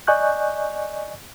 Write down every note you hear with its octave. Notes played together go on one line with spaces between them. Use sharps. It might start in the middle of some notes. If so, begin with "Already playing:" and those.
D5 D#5 G#5 C#6 F#6 G6